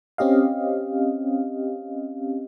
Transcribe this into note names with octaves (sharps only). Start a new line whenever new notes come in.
C4 C#4 G4 D#5 F5